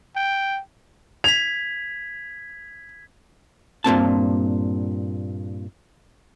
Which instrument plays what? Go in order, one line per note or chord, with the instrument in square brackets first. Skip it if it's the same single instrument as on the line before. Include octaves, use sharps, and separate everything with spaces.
[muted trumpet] G5
[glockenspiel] G#6 B6 [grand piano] F7
[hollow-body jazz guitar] G2 A#2 C4 A5